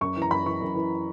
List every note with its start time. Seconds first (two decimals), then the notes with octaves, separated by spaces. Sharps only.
0.01 F#2 C#6
0.16 E3
0.22 A#5
0.31 F#2 B5
0.46 E3 C#6
0.61 F#2
0.75 E3